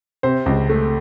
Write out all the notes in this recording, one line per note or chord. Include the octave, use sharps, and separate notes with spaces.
C3 C5
C#2
A3